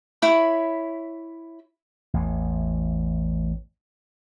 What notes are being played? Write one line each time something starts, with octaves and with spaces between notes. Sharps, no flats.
E4 C#5 B5
A1 E2